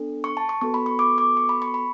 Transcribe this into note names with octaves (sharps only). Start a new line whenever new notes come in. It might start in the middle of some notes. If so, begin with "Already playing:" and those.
Already playing: B3 D4 A4
C#6
A5
C#6
B3 F#4 A4 C#6
B5
C#6
D6
D6
C#6
B5
C#6
B5